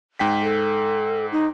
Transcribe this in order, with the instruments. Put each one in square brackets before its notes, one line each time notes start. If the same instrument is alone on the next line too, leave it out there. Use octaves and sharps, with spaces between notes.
[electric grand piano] G#2 G5 B6
[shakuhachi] A4
D#4